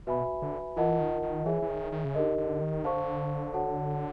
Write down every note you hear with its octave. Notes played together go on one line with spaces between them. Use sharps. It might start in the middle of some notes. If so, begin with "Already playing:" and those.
B2 F#4 B4 E5 G#5 B5
D3
E3 F4 A#4 D#5 F#5 A5
D#3
D#3
E3 G#4 C#5 E5 G#5
E3
D#3
D#3
C#3
D3 D#4 G4 A#4 D#5
D3
D#3
D3 C5 F5 A5 C#6
F#4 A4 C#5 F#5 A5